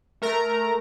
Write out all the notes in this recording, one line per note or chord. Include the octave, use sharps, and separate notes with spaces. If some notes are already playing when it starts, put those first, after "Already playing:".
A3 A#4 A#5